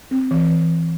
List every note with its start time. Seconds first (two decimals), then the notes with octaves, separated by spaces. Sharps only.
0.11 C4
0.31 E3